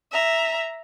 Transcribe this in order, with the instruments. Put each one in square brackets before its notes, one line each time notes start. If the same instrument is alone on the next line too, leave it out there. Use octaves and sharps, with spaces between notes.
[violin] E5 A#5